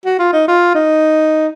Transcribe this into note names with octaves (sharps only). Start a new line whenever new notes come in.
F#4
F4
D#4
F4
D#4